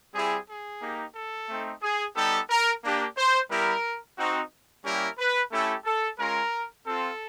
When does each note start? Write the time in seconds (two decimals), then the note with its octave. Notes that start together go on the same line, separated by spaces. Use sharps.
0.14 G3 C4 E4 G4 G#4
0.47 G#4
0.81 A#3 D#4 G4
1.15 A4
1.48 A3 C4 D#4
1.82 G#4
2.15 G3 B3 D#4 G4 A4
2.49 A#4
2.83 A#3 D4 G4
3.16 C5
3.50 G3 B3 E4 G4 A#4
4.17 C4 D#4 F#4
4.84 G3 A#3 C#4 E4 G4 A#4
5.18 B4
5.51 A3 C#4 E4 G4 A4
5.85 A4
6.19 G#3 C#4 F4 A#4
6.86 C4 F4 A4